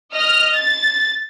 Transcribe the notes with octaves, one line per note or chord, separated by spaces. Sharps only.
D#5 F6
A6